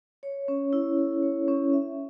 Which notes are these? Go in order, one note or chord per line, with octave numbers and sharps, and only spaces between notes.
C#5
C#4
E4
A4
C#5
C#4
E5